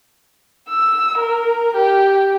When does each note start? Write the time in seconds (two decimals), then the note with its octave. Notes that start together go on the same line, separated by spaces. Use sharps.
0.70 E6
1.19 A#4
1.76 G4